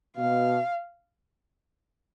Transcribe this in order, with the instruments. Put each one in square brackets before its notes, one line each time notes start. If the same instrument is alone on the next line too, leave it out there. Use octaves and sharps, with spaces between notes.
[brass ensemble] B2 [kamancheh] F5